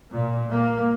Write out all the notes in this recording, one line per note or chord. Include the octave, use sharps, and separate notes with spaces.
A#2
A#3